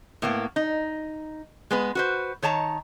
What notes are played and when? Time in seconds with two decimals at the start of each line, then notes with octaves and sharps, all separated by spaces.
0.22 A2 A#3 B3
0.56 D#4
1.71 G#3 B3 B4
1.95 F#4 B4 C5
2.42 D#3 C#5 A5 A#5